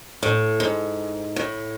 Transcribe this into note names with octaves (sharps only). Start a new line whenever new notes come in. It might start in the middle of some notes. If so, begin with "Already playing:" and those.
A2
G#2
A2